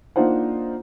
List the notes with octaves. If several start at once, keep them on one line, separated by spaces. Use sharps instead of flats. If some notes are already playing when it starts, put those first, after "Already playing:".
A#3 D4 D#4 F4 C5 F#5